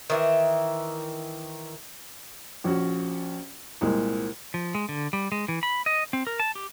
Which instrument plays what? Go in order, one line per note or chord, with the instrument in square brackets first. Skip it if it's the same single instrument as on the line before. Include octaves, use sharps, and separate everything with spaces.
[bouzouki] D#3 E3 E5
[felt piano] A#1 C#4 F#4
C2 A#2 G#3 A#3
[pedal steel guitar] F3
G#3
D3
G3
G#3
E3
B5
D#5
C4
A#4
A5
G4